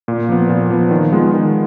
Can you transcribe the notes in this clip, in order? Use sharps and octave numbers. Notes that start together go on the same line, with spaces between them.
A#2
F3 B3
A#2
F3 B3
D#3
G#3 B3 F4
D#3